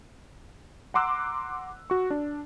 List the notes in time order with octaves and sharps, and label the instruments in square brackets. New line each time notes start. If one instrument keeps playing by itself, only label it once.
[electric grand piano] F#5 A#5 C6 D6 E6 F#6
F#4 C#6
D4